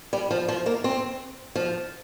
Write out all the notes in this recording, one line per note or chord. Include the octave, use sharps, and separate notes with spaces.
G3
F3
F3
A#3
C4
F3